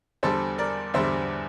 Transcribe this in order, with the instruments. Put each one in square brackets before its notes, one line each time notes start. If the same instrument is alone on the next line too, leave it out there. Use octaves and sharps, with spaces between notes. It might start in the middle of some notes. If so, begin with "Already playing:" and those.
[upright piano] E2 D3 G3 A4 C5
A#4 D5
E2 D3 G3 C5 E5